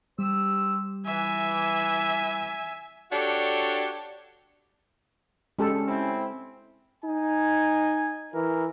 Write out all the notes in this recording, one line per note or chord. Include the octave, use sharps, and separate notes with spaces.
G3 G4 C5 E6
E3 E5 G#5
D4 F#4 G4 A4 C#5 D5
G#3 C#4 G4 A4
C4 E4
D#4 G#5
E3 A#4